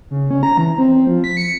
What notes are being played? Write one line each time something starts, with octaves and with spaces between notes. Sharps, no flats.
C#3
C#4
A#5
E3
C4
C4
F3
B6
C#7